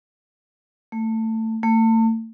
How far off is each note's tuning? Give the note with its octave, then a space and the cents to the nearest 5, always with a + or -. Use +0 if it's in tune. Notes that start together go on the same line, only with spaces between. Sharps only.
A3 +20
A3 +35